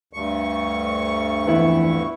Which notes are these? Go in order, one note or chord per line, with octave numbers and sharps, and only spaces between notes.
D2 G2 C#6
F2 E3 B3 E4